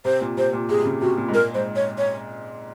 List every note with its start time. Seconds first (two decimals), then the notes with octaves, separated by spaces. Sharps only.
0.05 C3 C5
0.21 A#2
0.37 C3 C5
0.53 A#2
0.69 C3 G#4
0.79 C3
0.85 C#3
1.01 C3 F#4
1.17 A#2
1.29 G#2
1.34 A#2 A#4
1.54 G#2 C5
1.76 C#5
1.98 C#5